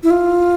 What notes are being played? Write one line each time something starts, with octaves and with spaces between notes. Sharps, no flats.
E4
F4